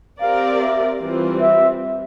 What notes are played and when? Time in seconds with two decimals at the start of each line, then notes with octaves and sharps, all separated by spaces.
0.21 C4 G4 A#4 D5 F5
0.61 E5
1.01 E3 G3 C4 F4
1.41 E5